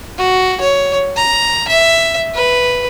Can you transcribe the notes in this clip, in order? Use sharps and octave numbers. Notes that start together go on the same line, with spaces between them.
F#4
C#5
A#5
E5
B4